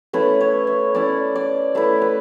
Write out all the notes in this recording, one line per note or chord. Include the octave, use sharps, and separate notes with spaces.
A3 C#4 E4 B4
C#5
E5
A3 C#4 E4 D5
D5
A3 E4 B4
B4